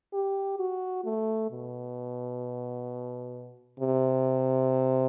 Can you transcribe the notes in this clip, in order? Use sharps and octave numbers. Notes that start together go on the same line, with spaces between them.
G4
F#4
A3
B2
C3